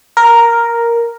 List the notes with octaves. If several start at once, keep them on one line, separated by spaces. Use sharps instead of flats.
A#4